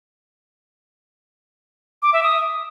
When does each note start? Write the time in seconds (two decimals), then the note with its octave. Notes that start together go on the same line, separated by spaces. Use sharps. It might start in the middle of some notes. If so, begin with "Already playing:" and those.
2.02 D6
2.13 E5
2.23 D#6